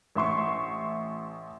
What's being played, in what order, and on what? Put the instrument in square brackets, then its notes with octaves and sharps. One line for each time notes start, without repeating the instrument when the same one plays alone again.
[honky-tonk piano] A1 E5 C6 C#6